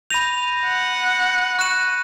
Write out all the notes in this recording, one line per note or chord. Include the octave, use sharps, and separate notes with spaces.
B5 G6 A#6 D#7 F7
F#5
C#7
C#6 F#6 E7